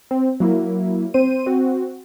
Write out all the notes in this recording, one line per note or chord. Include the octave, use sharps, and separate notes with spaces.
C4
F#3 A#3 E4
C4 C5 D#7
C4 F#4